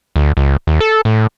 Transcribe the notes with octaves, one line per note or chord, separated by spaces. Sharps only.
D2
C#2
D#2
A4
A2